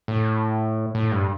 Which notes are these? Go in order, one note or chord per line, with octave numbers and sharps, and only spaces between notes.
A2
A2
G2